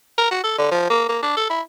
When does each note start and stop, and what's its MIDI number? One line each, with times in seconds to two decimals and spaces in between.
0.18 0.29 70
0.31 0.41 66
0.44 0.57 69
0.58 0.70 50
0.71 0.85 53
0.90 1.05 58
1.09 1.19 58
1.22 1.36 62
1.37 1.48 69
1.50 1.61 64